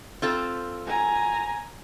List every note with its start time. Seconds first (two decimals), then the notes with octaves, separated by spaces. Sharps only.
0.22 C4 F4 A4
0.87 G#5 A#5